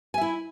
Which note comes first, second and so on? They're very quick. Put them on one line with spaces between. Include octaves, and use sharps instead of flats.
G#5 E5 E4